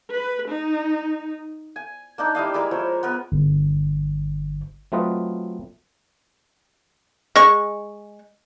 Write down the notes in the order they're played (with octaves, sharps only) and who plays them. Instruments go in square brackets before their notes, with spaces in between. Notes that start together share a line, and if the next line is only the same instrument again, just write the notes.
[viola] B4
D#4
[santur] G#5
A#3 D4 D#4
G3 E4 D#5 F5
G#3 E4 A#4 D5
F3 C5 C#5
B3 A#4 B4
[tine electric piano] G1
[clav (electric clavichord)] F#3 A3 C4 F4 B4 D#5
[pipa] G#3 C#6